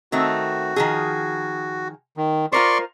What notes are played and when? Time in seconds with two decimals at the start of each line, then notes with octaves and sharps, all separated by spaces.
0.12 D#3 A3 C4 F#4
0.76 D#3 F3 G#4
2.17 D#3
2.52 F4 A#4 C5 D5 C6 C#6